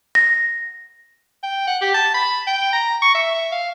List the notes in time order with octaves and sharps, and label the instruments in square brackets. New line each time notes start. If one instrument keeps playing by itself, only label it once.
[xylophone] A#6
[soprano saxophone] G5
F#5
G4
A5
B5
G5
A#5
C#6
E5
F5